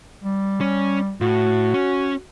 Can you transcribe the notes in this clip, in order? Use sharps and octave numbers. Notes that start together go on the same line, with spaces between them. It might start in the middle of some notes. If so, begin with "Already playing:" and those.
G3
C#4
A2 F#4
C#4